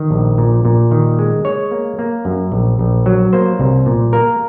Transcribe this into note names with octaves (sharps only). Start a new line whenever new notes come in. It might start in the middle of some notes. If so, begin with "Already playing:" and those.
Already playing: D#3
A#1
A#2
A#2
D#3
G#3
G#3 C#5
A#3
A#3
F#2
A#1
A#1
F#3
A#3 C5
C2
A#2
A#3 A#4